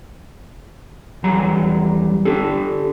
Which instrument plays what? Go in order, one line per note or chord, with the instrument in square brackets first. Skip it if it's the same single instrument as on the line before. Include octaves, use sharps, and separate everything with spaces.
[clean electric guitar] E2 F#3 G3 A#5
D4 G4 A4